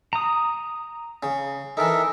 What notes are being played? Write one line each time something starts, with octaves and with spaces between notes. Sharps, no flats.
A#5 D#6
C#3
E3 D#4 A4 A#4 E5